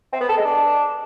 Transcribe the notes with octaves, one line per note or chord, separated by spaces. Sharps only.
C4
B3
A4
G#3
D4